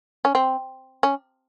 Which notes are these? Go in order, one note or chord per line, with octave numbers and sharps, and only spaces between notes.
C#4
C4
C#4